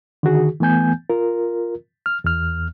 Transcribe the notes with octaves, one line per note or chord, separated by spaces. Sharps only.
D3 D#3 F#4 G#4
E3 A3 B3 G#5 G6
F4 A#4
F6
E2 F6